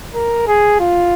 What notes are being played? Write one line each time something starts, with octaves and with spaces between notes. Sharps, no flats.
A#4
G#4
F4